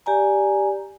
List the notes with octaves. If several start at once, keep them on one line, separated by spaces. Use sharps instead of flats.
G4 D5 G#5 A#5